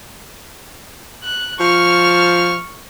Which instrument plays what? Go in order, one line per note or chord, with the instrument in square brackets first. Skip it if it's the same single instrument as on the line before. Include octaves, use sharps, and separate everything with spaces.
[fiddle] F#6
[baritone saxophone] F3 [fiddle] C#6 F6